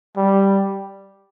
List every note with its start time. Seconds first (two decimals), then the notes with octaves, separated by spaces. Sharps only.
0.17 G3